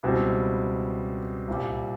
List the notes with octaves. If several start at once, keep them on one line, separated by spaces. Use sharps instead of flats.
C#2 B2 G3 C4 E4
C2 A#2 G3